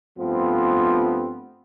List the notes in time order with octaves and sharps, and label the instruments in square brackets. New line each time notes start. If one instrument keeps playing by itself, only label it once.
[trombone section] G2 F3 A3 B3 C4